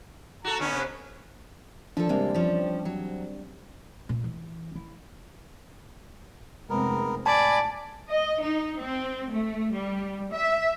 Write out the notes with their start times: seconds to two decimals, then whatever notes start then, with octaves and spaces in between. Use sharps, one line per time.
0.45 F#4 A4 A#5
0.60 D3 B3 C#4
0.72 C3
1.97 F3 D4 A4
2.09 C3 G3 G#3 A#3 C4
2.34 F3 C#4
2.85 F#3
4.09 A#2
4.24 E3
4.75 E4
6.70 F1 G#3 B3 C4 A#4
7.26 A2 D5 G#5 A5 B5
8.10 D#5
8.42 D#4
8.80 C4
9.29 A3
9.73 G3
10.31 E5